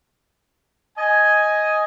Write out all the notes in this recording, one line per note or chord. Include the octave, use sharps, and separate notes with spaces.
D#5 G#5